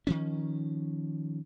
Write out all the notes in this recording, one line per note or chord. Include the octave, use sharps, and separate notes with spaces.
D#3 F3 C#4